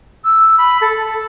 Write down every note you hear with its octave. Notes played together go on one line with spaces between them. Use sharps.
E6
B5
A4